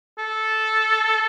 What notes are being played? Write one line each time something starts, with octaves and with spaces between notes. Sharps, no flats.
A4